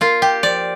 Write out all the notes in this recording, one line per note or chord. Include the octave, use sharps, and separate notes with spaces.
A#3 F4
G4
F3 D5